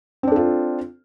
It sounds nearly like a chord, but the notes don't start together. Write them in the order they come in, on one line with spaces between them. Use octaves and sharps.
C4 D4 A4 F4